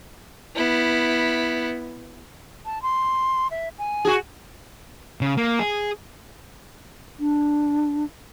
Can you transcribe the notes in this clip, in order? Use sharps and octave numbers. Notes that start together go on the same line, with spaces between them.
B3 E4
A5
C6
E5
G#5
F#4 G#4
C#3
A#3
G#4
D4